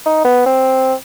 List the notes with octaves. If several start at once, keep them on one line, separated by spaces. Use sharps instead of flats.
D#4
B3
C4